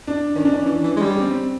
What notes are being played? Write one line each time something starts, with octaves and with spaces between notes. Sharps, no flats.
D4
D#3 C#4
D4
C#4
E3
E3
G#3
G3
C#4
C4